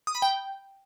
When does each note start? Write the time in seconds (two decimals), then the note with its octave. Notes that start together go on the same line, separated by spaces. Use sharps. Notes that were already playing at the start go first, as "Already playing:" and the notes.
0.07 D#6
0.15 B5
0.22 G5